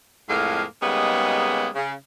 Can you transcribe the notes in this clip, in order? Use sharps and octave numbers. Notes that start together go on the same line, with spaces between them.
F2 A2 G#3 A#3 F5
C#3 G3 G#3 A#3 B3 D#4
C#3